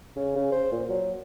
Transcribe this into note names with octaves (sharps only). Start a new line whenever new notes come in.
C#3
C#3
C5
A#2
F#3